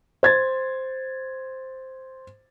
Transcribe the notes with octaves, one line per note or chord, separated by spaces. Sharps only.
C5 G#6 A6